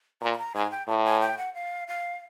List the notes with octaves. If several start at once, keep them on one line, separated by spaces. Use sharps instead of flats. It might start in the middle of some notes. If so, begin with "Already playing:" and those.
A#2 A#5
B5
A#5
G#2 G#5
G5
A2 A5
G#5
G5
F#5
F5
F5